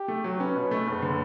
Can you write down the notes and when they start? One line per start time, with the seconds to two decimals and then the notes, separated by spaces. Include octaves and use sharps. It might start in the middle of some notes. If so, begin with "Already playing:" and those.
Already playing: G4
0.08 A3
0.24 F#3
0.39 C#4 B4
0.56 B2
0.71 A3
0.87 F#1
1.02 D3